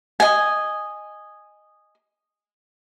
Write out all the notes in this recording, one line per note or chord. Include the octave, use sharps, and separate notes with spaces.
D#5 G#5